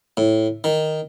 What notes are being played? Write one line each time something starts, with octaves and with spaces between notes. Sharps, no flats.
A2
D#3